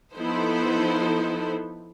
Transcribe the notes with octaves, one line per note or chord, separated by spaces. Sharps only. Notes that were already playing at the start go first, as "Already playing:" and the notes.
F3 B3 D#4 E4 A4 C5